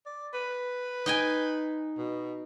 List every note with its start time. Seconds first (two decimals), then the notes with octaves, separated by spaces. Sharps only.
0.06 D5
0.34 B4
1.06 D#4 G5 G#5
1.98 B2